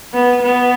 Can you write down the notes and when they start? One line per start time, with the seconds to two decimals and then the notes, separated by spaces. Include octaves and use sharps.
0.14 B3
0.42 B3